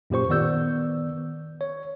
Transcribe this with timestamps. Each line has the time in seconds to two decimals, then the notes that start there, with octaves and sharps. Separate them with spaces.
0.10 F#2 A#2 G4 C5 C#6
0.29 D#3 B3 D5 E6 G6
1.61 C#5